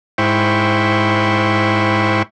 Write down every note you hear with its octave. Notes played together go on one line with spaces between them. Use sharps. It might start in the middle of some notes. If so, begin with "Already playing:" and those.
G#2 E4 C5 G5 B5 C#6